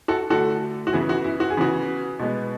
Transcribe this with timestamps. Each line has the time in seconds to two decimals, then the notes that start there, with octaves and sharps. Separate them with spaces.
0.08 F#4 A4
0.30 D3 A3 F#4 A4
0.87 F#4
0.93 C#3 E3 B3 E4 G#4
1.09 F#4
1.24 E4
1.40 F#4
1.50 G#4
1.57 C#3 E3 B3 F#4
2.19 B2 G#3 B3